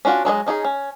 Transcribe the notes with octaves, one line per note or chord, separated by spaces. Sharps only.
C#4 D4 F4 F#4
F#3 G#3 G#4 D#5
C#4 D#4 E4 G#4
C#4